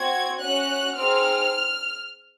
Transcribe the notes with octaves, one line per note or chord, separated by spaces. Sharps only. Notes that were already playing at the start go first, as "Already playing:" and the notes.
Already playing: C4 F#4 G#6
C#4 F#4 F#6
C4 D#4 G#4 F6